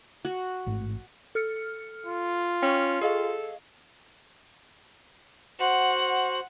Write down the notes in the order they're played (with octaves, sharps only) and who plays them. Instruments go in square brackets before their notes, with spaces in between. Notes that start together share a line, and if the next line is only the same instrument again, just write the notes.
[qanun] F#4
[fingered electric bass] A1 G#2 A3
[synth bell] A4 F6 C#7
[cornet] F4
[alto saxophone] C#4 [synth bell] G5 C#6
[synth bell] G#4 D#5 F5 [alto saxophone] A4
[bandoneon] F#4 C5 [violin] F#5